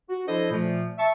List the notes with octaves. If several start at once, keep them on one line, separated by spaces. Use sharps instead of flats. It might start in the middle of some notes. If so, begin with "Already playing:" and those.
F#4
F3 D4 E4 A4 C5 D#5
A#2 F3 A3
E5 A5 C#6